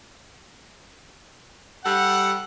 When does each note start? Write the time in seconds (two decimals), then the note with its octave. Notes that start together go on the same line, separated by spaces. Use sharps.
1.85 G3 A4 F#5